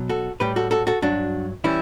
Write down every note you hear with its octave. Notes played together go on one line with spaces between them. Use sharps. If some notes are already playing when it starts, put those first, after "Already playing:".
Already playing: B2 F#3
F#4 A4
A2 G3 G4 B4
F#4 A4
F#4 A4
F#4 A4
G2 F#3 D4 F#4
E3 G3 C#4 E4